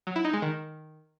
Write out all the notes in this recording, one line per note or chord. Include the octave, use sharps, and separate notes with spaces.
F#3
E4
D#4
G#3
D#3